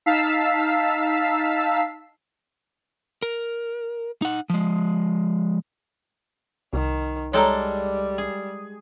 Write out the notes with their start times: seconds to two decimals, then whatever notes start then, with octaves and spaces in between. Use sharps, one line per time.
0.06 D#4 F5 A5 E6 B6 C7
3.22 A#4
4.22 D#4 F#5
4.50 F3 G#3
6.73 C2 D#3
7.33 G3 G#3 A4 C#5 G5 A#5
8.18 G#4